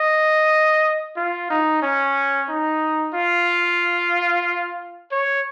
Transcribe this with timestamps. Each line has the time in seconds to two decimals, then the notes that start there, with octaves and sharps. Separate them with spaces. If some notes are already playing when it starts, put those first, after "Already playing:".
Already playing: D#5
1.16 F4
1.50 D#4
1.82 C#4
2.49 D#4
3.14 F4
5.11 C#5